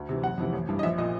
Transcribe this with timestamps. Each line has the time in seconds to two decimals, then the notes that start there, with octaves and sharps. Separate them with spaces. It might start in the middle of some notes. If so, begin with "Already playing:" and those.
Already playing: D2
0.09 C3 E3
0.23 F#1 F#5
0.38 F2 C3 E3
0.53 A1
0.69 G2 E3
0.79 D#5
0.83 A#1 E5
0.98 A#2 D#5